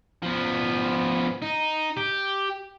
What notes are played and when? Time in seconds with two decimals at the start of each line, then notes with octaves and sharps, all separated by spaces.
0.23 F3 B3
1.42 D#4
1.97 G4